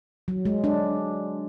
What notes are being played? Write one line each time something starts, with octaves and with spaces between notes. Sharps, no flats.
F#3
G#3
D4